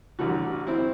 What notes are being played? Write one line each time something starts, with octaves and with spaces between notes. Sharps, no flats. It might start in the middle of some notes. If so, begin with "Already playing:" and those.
A1 D3 G3 F#4
C4 E4